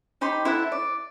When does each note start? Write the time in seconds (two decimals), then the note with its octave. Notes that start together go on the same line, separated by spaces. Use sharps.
0.21 D#4 G4 B5 C6
0.45 E4 A4 E5 F#5
0.72 D5